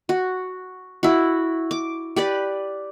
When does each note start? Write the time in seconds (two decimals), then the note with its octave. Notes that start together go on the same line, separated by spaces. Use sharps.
0.09 F#4
1.03 E4 F#4
1.71 D6
2.16 G4 B4 D5